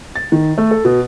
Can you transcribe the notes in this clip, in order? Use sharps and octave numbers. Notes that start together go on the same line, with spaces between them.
A6
D#3
A3
A4
B2